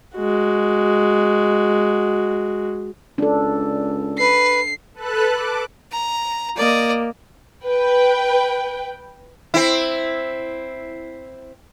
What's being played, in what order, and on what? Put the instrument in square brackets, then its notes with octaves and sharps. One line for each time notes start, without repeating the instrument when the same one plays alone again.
[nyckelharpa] G#3 F#4
[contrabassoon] C#2 [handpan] D4 A4
[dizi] B4 [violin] C7
[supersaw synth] A4 B4 A5 F#6
D6
[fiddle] A#5
[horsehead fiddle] A#3 [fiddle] D5 D#5
[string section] B4 G5
[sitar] C4 E4